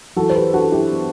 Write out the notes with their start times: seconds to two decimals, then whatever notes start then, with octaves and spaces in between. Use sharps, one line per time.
0.16 E3 F#4 A4
0.30 C5
0.35 G4 B4
0.53 D4 F#4 A4
0.72 E4 G4
0.91 B3